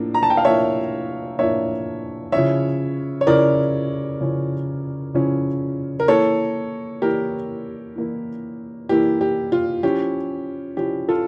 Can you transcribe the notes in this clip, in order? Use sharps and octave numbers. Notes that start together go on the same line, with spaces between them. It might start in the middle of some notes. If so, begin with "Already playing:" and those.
Already playing: A2 F3 A#3 D4
A#5
A5
G5
F5
A2 F3 A#3 D4 C#5 E5
A2 F3 A#3 D4 C#5 E5
C#3 F3 C#4 E4 C#5 E5
C#5
C#3 F3 C#4 E4 A#4 D5
C#3 F3 C#4 E4
C#3 F3 C#4 E4
A#4
E3 A#3 E4 A4 C#5
E3 A#3 E4 G4 A#4
E3 A#3 E4
E3 A#3 E4 G4
G4
F4
F3 C#4 E4 G4
F3 C#4 E4 G4
F4 A4